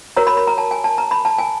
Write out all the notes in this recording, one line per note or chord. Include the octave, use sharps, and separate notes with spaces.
F#4 A#4 C#5 A#5
B5
B5
A#5
A5
G#5
A5
A#5
B5
A5
G#5